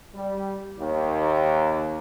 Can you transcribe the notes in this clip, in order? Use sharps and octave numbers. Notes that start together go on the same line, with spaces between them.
G3
D#2